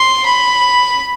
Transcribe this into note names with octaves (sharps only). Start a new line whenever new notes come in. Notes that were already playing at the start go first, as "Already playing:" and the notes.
Already playing: C6
B5